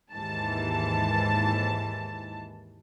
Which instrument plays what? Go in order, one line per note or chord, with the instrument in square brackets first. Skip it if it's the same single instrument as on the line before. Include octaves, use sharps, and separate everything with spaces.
[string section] D#2 G#2 E3 A5